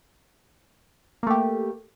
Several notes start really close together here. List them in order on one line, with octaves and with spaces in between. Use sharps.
A#3 A3 G4